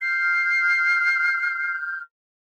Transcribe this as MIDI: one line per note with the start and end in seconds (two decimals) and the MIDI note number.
0.01 2.00 89
0.01 2.00 91
0.01 1.74 96